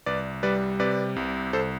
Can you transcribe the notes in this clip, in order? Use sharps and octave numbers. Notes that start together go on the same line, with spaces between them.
C2 B4 D5
G3 B4 D5
C3 B4 D5
C2
C2 A4 C5